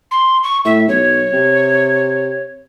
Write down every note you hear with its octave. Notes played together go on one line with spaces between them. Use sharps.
C6
C#6
A2 E5
B1 C#5
C3